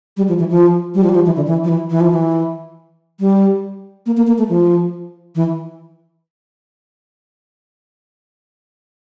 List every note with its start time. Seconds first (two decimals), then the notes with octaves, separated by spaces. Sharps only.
0.17 G3
0.28 F3
0.39 E3
0.50 F3
0.95 G3
1.04 F3
1.09 G3
1.15 F3
1.26 E3
1.36 D3
1.46 E3
1.64 F3
1.69 E3
1.90 E3
2.01 F3
2.11 E3
3.20 G3
4.06 A#3
4.17 A#3
4.27 A#3
4.38 A3
4.49 F3
5.35 E3